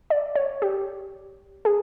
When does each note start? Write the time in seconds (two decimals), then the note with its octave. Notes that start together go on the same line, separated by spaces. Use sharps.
0.10 D5
0.35 C#5
0.62 G4
1.65 G#4